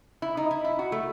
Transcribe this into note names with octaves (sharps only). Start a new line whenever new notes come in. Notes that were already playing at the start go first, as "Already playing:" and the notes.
E4
D#4
E4
E4
F#4
A3